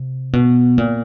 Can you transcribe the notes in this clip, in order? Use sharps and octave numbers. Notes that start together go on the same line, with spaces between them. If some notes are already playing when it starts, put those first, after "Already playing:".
Already playing: C3
B2
A#2